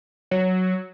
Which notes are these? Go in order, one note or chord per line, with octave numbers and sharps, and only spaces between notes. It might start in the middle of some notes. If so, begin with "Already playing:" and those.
F#3